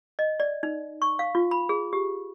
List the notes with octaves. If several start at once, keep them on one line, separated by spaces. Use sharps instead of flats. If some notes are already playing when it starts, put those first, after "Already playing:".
D#5
D5
D#4
C#6
F5
F4
B5
G#4
G4